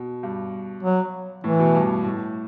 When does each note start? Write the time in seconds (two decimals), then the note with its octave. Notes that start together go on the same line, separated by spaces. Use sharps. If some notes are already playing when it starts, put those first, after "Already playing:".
Already playing: B2
0.23 G2
0.83 F#3
1.44 A2 E3
1.59 B2
1.74 G2
2.04 A2